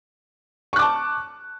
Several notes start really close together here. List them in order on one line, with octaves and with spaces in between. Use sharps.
C#6 F#6 D6 A5